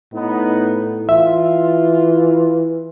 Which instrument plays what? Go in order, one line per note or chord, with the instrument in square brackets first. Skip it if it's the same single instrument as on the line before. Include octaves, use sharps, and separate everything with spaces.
[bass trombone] A2 [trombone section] B3 D#4
[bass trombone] E3 [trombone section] F4 [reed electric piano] E5